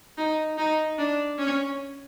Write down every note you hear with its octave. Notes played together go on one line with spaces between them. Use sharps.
D#4
D#4
D4
C#4